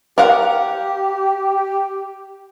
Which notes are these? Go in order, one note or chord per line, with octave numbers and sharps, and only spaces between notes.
G4 A#4 F5 F#5